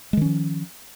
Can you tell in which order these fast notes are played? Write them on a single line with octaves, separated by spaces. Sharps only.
G#3 D#3 C#4 F3